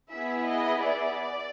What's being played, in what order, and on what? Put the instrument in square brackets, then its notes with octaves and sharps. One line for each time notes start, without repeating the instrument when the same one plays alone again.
[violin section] B3 E4 G#4 E5
D#5
D5